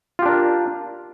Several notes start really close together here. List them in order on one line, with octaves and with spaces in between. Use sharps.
F4 G4 D4 A#4